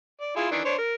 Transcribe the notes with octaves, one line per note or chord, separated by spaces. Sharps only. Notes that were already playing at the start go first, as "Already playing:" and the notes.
D5
E4 F4 G#4
D#3 E3 D4
D4 C5 C#5
A#4